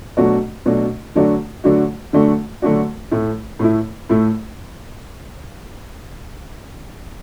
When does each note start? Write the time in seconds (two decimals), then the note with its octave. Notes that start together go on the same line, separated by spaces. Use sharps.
0.17 B2 F#3 A3 D4 F#4
0.66 B2 F#3 A3 D4 F#4
1.15 D3 F#3 A3 D4 F#4
1.64 D3 F#3 A3 D4 F#4
2.13 D3 F#3 A3 D4 F#4
2.62 D3 F#3 A3 D4 F#4
3.11 A2 A3 E4
3.59 A2 A3 E4
4.09 A2 A3 E4